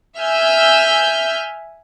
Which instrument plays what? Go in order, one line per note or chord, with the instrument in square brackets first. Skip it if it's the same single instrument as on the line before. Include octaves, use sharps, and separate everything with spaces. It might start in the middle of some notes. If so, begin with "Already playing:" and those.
[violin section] E5 G#5 E6 F6 G6